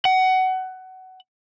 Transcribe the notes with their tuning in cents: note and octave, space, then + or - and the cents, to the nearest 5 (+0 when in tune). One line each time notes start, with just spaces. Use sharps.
F#5 +20